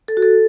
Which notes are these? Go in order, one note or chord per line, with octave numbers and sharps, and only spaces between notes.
A4
F#4
A4